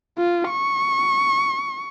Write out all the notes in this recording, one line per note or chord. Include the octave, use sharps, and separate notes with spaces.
F4
C#6